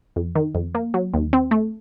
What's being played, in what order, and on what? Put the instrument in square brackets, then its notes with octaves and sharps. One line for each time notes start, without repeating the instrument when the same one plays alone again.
[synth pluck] F2
D#3
F2
A#3
F#3
D#2
C4
A3